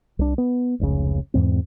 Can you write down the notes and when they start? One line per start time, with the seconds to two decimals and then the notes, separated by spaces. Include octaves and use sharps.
0.19 C2 D4
0.38 B3
0.80 F1 C#2 C#3
1.34 E2 G#2 C4